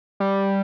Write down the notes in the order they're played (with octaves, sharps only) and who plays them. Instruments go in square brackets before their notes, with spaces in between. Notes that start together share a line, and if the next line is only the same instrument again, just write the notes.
[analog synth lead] G3